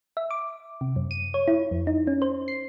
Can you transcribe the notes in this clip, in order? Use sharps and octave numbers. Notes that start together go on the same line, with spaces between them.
E5
D6
C3
F#2
D#7
C#5
E4
F2
D#4
C#4
C5
C7